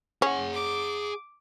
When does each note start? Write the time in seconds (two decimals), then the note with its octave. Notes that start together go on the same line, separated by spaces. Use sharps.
0.22 C#4 G#4 F#5
0.53 D6